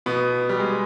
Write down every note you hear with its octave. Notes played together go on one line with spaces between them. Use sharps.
B2 B3
G3
G#3